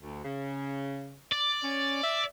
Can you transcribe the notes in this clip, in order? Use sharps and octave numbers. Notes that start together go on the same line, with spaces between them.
D2
C#3
D5
C#4
E5